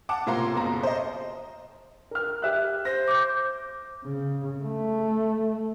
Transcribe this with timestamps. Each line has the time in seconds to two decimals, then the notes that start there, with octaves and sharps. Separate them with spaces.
0.09 F#5 A5 D6
0.26 A2 C3 A#3 F4 A#5 C6
0.55 F#1 B2 A#5
0.83 C5 D#5
2.11 A#4 F6
2.42 G4 E5 F#6
2.85 C5 A#6
3.08 D6 G6
4.05 C#3
4.64 A3